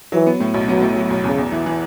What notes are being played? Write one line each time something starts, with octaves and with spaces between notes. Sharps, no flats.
E3 F#3
B3
A2
B1
F#3 B3
A2
F#3
B1
E2 C#3
E2
E3
E3